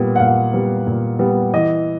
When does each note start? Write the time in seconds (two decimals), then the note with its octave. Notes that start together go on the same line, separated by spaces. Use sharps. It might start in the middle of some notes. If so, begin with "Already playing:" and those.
Already playing: A#2 G3 B3
0.16 F#5
0.19 A#2 F5
0.53 G3 B3
0.87 A#2
1.19 G3 B3
1.53 E3 D#5